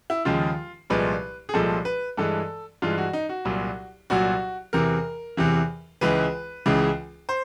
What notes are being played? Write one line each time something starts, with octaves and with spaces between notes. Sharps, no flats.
E4
D#2 C#3 F3 G#3 F4
C2 A#2 F3 G#3 B4
G#4
C2 A#2 F3 G#3 A4
B4
G2 E3 G#3 A4
G2 E3 G#3 F4
F#4
D#4
F#4
C2 A#2 F#3
C2 A#2 F#3 F#4
E2 C3 E3 A#4
E2 C3 E3
C#2 C#3 E3 G#3 B4
C#2 C#3 E3 G#3
C5